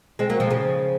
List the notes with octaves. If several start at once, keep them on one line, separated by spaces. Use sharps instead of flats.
G#3 C4
F#3 A#3
F3 G#3
C#3 F3